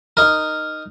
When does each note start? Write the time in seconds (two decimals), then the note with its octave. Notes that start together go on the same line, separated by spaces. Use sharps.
0.17 D#4 A#4